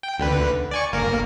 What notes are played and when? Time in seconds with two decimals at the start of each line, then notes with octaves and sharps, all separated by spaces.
0.03 G5
0.18 D2 D3 B4
0.71 D5 G#5 C#6
0.92 G1 A#3 A#4